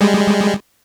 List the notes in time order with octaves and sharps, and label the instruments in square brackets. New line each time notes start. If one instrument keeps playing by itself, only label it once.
[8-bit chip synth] G3 G#3